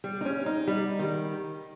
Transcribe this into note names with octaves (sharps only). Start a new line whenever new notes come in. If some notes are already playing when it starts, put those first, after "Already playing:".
G3
D#4
C#4
D#4
G3
D#3